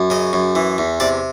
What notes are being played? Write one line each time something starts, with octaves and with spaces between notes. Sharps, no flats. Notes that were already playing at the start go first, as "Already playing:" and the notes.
Already playing: F#2
C#3 D#5
F#2
E3
E2
C3 D5